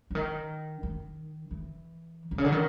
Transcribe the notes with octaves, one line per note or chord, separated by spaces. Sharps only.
D3
D#3
D#3
E3
C3
C#3
D3
D#3